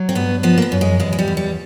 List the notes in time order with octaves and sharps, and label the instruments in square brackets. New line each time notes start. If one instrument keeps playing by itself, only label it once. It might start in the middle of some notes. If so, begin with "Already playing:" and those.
Already playing: [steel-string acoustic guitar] F#3
C4
G2 B3
F3 B3
A#3
B3
F#2
G#3
E2 G#3
G#3
G3
E2
G3